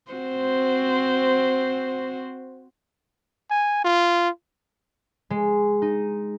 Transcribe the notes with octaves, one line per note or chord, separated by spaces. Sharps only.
C4 F#4 C5
G#5
F4
G#3
D#4